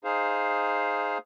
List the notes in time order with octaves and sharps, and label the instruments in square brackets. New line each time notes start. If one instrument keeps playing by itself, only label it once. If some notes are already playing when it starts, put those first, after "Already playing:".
[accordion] D#4 G#4 C5 F5